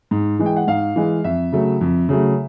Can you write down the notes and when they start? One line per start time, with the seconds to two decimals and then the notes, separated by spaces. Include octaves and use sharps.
0.11 G#2
0.39 E3 G#3
0.46 G5
0.57 F#5
0.67 G#2 F5
0.96 E3 G#3
1.24 F2 E5
1.53 C#3 F#3 A3
1.81 F2
2.09 C#3 F#3 A3